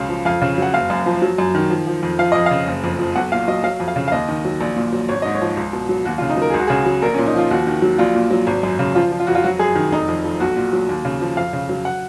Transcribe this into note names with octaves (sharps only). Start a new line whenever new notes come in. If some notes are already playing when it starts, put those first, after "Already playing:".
Already playing: C#2 C#3 F#3 F5
F3
F2 F5
C#3
F#3 F#5
F#1 F5
F#2
F3
F#3
F#2
D#3
F3
F3
F2
F3 F5
F2 D#5
C#3 F5
F#1
F2
F3
B1 F#5
A#2 F5
F#3 D#5
F#3 F5
F2
F5
C#3
F5
D#2 D#5
D#3
F#3
A#1
A#2
F#3
G#1 C#5
G#2 D#5
C#5
F3
C#2
B2
F#3
D#2 F#4
F4
C#3
D#4
F#3 A#4
G#4
C#2
F#4
C#3 G#4
F#3
A#1 A#4
A#2 C#4
D#4
F3 F4
D#2 F#4
D#3
F#3
A#1 F4
A#2
F#3
G#1
F#2
C#3
F3 F4
F3
F4
F2 F#4
F4
F#3 F#4
F#2 G#4
D#3
F1 D#4
F2
F3
B1 F#4
A#2
F#3
D#2
C#3
F3
F2 F5
C#3
F#3
F#5